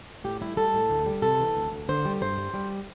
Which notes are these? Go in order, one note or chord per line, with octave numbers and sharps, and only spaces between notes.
A2 G4
G3 E4
G3 A4
A2
D2
G3
C3 A4
E3
D2
D2
D3 C5
G3
G2 C5
G3
G3